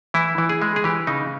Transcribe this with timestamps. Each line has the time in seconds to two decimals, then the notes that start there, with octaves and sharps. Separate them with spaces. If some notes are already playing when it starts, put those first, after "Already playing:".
0.14 E3 E4
0.38 E3
0.49 G#4
0.62 G#3
0.76 G#4
0.84 E3 G4
1.07 C#3 D#4